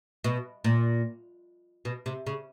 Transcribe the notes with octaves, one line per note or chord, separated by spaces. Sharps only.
B2
A#2
B2
C3
C#3